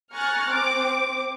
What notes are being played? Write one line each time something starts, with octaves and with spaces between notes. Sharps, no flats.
G#5 A#5 C#6 F6 F#6 A6
C4 D6